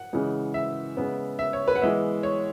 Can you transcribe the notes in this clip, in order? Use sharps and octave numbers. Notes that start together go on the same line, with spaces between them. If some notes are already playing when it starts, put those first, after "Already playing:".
Already playing: F#5
C#3 E3 G#3
E5
C#3 G#3 B3
E5
C#5
B4
F#5
E3 G#3 B3 E5
C#5